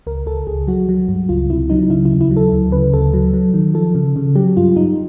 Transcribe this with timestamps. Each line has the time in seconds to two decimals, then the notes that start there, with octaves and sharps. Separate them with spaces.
0.07 C#2 A#4
0.26 C#2 A4
0.47 C#2 G#4
0.67 F#3 F#4
0.89 F#3
1.08 G2
1.29 C#2 F4
1.50 C3 E4
1.70 F#3 D#4
1.90 C#3 E4
2.05 E4
2.12 D#2
2.21 E4
2.31 F#3
2.37 A4
2.52 D2
2.72 C#3 B4
2.94 D2 A4
3.14 F#3
3.34 F#3
3.54 D#3
3.74 F3 A4
3.95 C#3
4.16 C#3
4.36 F#3 G4
4.57 G2 F4
4.76 G2 D#4